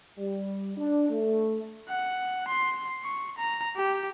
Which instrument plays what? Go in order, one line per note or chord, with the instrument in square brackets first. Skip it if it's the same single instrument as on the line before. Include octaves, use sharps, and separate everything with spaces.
[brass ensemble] G3
D4
A3
[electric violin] F#5
C6
C#6
A#5
G4